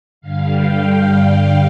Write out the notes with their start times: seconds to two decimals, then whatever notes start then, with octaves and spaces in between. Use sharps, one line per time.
0.21 G2 D3 G3 F5
0.49 G5
1.33 F5